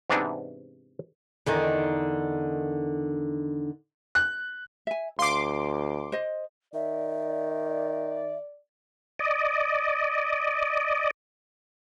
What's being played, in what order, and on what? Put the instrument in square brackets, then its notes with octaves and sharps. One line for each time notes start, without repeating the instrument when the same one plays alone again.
[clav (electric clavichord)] G#2 C3 E3 B3 D4 D#4
[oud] E2 D3 D#3
[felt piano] F#6
[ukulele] E5 G#5
[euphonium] D2 [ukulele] F5 [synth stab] C6 D6
[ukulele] C5 D#5
[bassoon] D#3 [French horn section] D5 [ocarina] E5
[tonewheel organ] D5 D#5